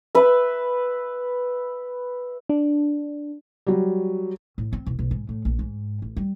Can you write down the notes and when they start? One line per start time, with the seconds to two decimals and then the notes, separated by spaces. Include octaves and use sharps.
0.15 B4 E5
2.49 D4
3.67 F#3 G3
4.58 A2
4.73 C4
4.86 E1
4.99 B1
5.11 G#2
5.29 A2
5.45 A#1
5.59 G#2
6.02 A1
6.16 G3